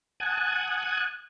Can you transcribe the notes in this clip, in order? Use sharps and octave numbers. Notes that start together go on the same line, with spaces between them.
F#5 G#5 A5 D#6 F#6 G#6